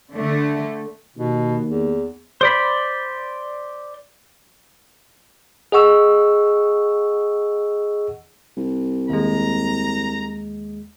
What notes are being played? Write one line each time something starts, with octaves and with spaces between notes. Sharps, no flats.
D3 A3
D#2 B2
E2
C5 D5 B5
G#4 D#5 F#5 C#6 E6
C2
D#2 G#3 A#5